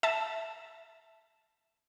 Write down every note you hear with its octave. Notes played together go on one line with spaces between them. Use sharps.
E5 A5